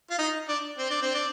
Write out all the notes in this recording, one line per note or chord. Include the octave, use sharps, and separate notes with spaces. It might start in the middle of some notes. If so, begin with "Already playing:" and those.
F4
D#4
D4
C4
D4
C4
D4